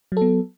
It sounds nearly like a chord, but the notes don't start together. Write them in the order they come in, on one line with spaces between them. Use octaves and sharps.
F#3 A4 B3